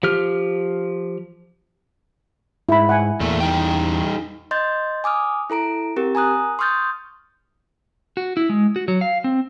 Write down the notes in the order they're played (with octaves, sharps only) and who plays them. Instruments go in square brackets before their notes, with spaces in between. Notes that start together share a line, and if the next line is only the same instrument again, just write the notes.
[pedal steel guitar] F3 G4 F6
[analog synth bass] G#2 [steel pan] E4 B5
[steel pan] F#5 G#5
[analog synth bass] E2 [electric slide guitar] A#2 A3
[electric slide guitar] G3 D#4 G5
[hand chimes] D#5 C6 G6 A6
G#5 D6 D#6 F6
E4 A4 A#5 D7
C4 G4 A#4
G#5 A#5 D#6 F#6
C6 C#6 D#6 F6 G6 A6
[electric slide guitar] F#4
E4
G#3
F#4
F#3
F5
C4